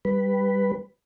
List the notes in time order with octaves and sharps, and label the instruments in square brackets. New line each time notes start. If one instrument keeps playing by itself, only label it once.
[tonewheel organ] G3 B4